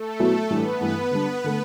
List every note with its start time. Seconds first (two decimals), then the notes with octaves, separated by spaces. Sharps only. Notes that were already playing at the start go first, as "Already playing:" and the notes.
Already playing: A3 A4
0.19 B2 F#3 B3 E4
0.50 A2 E3 G3 B3 D4 B4
0.81 G2 E3 A3 E4
1.11 D3 G3 D4
1.44 D3 A3